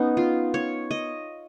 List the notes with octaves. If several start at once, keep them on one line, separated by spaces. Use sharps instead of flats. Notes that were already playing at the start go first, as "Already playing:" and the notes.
Already playing: B3 C#4 D#4
F4
C#5
D#5